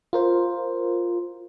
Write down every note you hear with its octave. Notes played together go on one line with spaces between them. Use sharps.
F4 A#4 C5